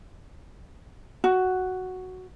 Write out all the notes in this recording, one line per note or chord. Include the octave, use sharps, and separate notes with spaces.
F#4